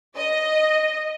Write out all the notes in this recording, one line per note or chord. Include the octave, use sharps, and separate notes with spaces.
D#5